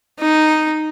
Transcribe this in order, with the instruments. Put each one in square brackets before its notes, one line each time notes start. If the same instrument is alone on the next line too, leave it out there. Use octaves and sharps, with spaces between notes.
[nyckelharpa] D#4